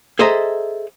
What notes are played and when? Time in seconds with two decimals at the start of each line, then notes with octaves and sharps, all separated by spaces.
0.19 G#4 A4 C5 D#5 E5 A#5